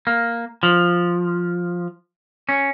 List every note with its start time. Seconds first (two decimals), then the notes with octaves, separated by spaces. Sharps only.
0.07 A#3
0.63 F3
2.49 C#4